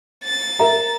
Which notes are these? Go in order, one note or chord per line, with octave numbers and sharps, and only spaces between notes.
A6
A#4 E5 A#5